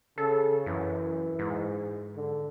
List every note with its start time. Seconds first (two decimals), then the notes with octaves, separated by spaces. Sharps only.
0.18 C#3 A4
0.66 F#2 E3
1.39 G#2
2.16 D3